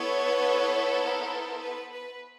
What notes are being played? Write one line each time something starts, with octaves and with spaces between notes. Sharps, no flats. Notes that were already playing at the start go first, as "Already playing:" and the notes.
Already playing: B3 E4 A4 B4 C#5
A#4 C5
B4
B4